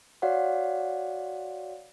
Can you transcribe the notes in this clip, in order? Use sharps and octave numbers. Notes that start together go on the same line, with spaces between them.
F#4 C#5 D5 F5 F#5